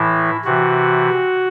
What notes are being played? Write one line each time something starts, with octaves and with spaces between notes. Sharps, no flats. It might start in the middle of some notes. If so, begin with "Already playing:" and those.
Already playing: A2 E3 E4
C3 E3 F#4